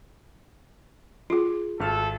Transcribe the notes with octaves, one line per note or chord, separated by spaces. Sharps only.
F4 F#4 G#4
G#1 A4 F6